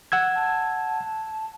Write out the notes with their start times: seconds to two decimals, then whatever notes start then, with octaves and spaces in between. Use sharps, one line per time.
0.12 F#5 E6 G#6
0.35 A5